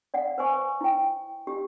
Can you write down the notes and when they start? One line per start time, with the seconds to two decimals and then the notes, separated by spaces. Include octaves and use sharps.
0.14 D5 F5 F#5
0.38 B4 C5 G#5 C#6
0.81 E4 G5
1.47 G4